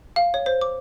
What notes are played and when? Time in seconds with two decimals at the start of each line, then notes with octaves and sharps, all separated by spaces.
0.16 F5
0.34 C#5
0.46 C5
0.61 D6